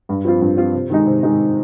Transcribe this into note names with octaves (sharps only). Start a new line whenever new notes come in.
G2
F3 C4 F4
G2
F3 C4 F4
C3
D#3 G#3 D#4
C3
D#3 G#3 D#4